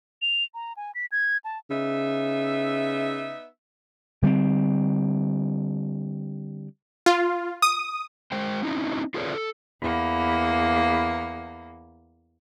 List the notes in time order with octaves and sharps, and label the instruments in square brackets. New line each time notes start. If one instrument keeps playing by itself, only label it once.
[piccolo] F7
A#5
G#5
B6
G#6
A5
[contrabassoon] C#3 [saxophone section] B3 D#4 E5
[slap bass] D3 G3 G#3 C4
[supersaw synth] F4
D#6
[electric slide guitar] G#3 C5 G5
C4 C#4 D#4 E4
F4 G#4 A4 B4 C#5 D5
A4
[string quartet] E2 A#3